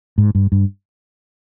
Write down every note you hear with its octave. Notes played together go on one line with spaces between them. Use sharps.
G#2
G2
G2